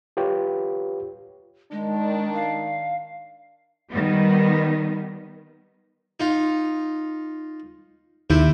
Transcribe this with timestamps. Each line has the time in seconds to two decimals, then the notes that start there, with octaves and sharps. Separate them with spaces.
0.17 F4 G4 B4 C#5 G5
1.72 D#3 G#3 D4
2.34 F5
3.90 D#3 G3 B3
6.20 D#4 F4
8.30 D#2 C3 E4 G5